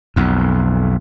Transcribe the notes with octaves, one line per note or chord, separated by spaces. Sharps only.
B1 F2